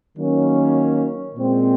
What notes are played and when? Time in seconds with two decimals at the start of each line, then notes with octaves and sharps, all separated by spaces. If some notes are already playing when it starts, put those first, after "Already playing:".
0.17 D#3 F#3 A#3 C#4
1.35 A#2 G#3 C4